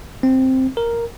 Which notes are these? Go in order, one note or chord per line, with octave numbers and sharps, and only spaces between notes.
C4
A#4